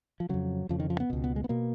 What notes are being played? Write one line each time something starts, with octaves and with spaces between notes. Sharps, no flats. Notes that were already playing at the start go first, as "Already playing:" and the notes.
F3
F2 C#3 F#3
F2 C#3 F3
D#3
F3
B3
C#2 B2
B3
G#3
B3
B2 A#3